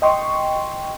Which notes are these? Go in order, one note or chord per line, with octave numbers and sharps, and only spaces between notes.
D#5 G5 C6 C#6